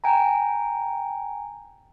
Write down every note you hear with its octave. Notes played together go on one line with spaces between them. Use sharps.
G5 G#5 A#5